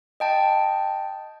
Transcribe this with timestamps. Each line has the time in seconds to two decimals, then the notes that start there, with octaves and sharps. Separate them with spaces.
0.20 D#5 G5 A5